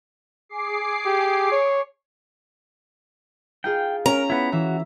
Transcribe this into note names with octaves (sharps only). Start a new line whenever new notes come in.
G#4 D6 C7
G4
C#5
D#4 F4 G#4 G5
C#4 A#4 A#5
B3 E4
E3 F#4 E5